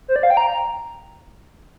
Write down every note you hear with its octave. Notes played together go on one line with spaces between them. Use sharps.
C5
D5
F5
G5
A#5